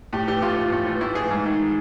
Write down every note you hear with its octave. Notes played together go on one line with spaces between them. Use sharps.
A2 G4
E3 G4
A2 F4
E3
A2
E3
A2 E4
E3 G#4
G#2
D#3